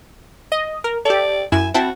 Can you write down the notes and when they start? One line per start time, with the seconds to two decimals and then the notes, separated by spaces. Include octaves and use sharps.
0.52 D#5
0.84 A#4
1.05 G4 A4 D5
1.52 F#2 E4 G#5 E7
1.74 C4 E4 F#4 A5